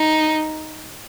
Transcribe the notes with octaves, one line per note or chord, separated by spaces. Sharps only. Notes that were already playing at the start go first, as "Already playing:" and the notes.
Already playing: D#4